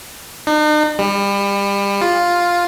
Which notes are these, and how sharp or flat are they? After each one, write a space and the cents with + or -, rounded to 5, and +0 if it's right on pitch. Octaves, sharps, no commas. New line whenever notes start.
D#4 -45
G3 +30
F4 +5